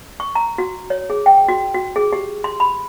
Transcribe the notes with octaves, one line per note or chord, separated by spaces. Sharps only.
C#6
A#5
F#4
C#5
G#4
G5
F#4
F#4
G#4
G4
C6
B5